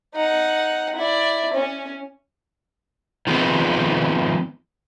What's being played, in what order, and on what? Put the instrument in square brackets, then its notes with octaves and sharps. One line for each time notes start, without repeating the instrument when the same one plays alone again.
[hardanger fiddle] D#4 F#5
E4 D5
C#4
[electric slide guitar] D#3 F3 G#3 B3 C4